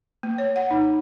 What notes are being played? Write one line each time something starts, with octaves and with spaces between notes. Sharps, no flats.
A#3
C#5
F#5
D#4